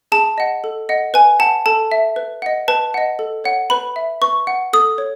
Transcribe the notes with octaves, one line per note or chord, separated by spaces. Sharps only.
G#4 A5
D#5 F#5
A4
D#5 F#5
B4 G#5
F#5 A5
A4 A5
E5
B4
D#5 F#5
B4 A5
D#5 F#5
A4
C#5 F#5
B4 B5
E5
B4 C#6
F#5
A4 D#6
C#5